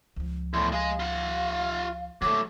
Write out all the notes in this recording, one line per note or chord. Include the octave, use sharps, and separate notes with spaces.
C#2 F3
E2 A2 C6
G#3 G#4 F5
F4 F#5
D3 F#3 A3 A#3 D6